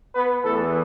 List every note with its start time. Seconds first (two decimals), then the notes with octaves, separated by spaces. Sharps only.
0.15 B3 B4
0.44 E2 E3 A3 B3 A4